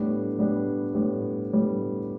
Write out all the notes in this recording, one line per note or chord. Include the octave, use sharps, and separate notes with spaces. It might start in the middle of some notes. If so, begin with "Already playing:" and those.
Already playing: A2 G3 B3 D4 G4
A2 G3 B3 D4 G4
A2 G3 B3 D4 G4
A2 G3 B3 D4 G4